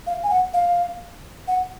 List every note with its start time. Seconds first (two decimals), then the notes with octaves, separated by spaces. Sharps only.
0.07 F5
0.23 G#5
0.30 F#5
0.54 F5
1.48 F#5